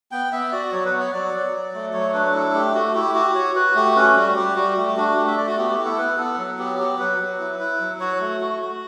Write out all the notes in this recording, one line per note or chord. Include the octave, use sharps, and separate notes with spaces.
B3 G5
B3 E5
F#4 D5
F#3 C#5
B4
B3
C#5
F#3 D5
F#3
F#3
A3
F#3 C#5
D4 B4
E4 A4
A3 G4
A3 F#4
E4 G4
F#4 G4
F#4 C#5
F#4 B4
A3 G4
C#4 B4
G3 F#4
G3 G4
G3 F#4
A3 G4
D4 F#4
A3 G4
E5
A3 D5
F#4
B3 G4
G4
E4
A4
B3 B4
B3 A4
F#3
B3 G4
F#3 G4
F#3 B4
F#3
E4
E4
F#3
F#4 C#5
A3
F#4
F#4